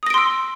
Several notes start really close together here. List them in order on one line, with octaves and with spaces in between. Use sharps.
D#6 A#6 D7 C6 E6